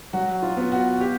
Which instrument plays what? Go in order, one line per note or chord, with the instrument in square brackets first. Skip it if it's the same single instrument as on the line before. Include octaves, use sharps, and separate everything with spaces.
[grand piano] F#3 F#4
F4
B3
F#4
G4